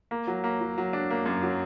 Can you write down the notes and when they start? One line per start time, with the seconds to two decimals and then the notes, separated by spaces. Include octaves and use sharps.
0.11 A#3
0.27 F#3
0.44 A#3
0.61 F#3
0.78 F#3
0.93 D4
1.10 A#3
1.26 F#2
1.43 F#3